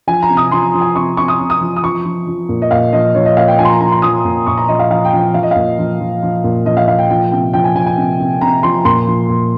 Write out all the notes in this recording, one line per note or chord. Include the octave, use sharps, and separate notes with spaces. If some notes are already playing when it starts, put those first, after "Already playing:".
F3 G#5
A#5
C3
D#6
F3 C6
F3
G#5
C3 C#6
C3 C#6
D#6
C3
D#6
F3
D#6
F3 C#6
F3
F3
A#2
D#5
A#2 F5
F3 D#5
F3 C#5
D#5
A#2 F5
G5
F3 G#5
C6
A#5
F3 A#5
C6
F3 D#6
A#2
A#2 C#6
A#5
F3 D#5
F5
F3 F5
G5
F3
G5
F3 F5
D#5
A#2 F5
F3
F3
F3
A#2
F3 D#5
F5
A#2 F5
G5
F3 G5
C3 G5
F3 G5
G#5
F3 G#5
G#5
C3
C3
C3 A#5
F3 C6
A#2 C6
F3
A#2